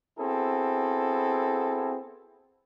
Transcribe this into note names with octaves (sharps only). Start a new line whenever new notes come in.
B3 C4 E4 F#4 G#4 A4